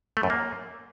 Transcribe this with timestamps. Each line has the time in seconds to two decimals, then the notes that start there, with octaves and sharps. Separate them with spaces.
0.17 A3
0.23 F#2
0.30 A#3